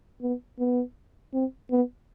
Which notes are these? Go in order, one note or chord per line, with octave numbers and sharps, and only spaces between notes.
B3
B3
C4
B3